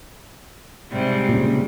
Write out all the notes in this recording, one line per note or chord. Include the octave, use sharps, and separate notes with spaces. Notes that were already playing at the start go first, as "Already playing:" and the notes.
G#2 C3 G3
A#2 C#3